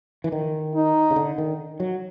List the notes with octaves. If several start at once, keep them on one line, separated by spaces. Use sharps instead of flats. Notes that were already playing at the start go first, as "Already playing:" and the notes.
E3
D#3
D#4
C#3
D3
D#3
F#3